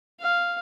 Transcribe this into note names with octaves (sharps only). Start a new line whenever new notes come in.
F5